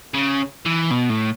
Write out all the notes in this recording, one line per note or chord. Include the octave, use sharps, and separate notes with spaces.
C#3
E3
B2
A2